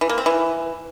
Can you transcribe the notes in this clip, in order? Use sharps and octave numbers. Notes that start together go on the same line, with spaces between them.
E3
A#3
C4
E3